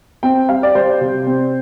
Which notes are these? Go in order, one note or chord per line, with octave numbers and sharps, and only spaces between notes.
C4 G5
G3 F5
D5
G3 C5
C3
C4